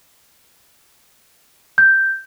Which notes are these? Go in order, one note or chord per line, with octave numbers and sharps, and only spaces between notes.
G6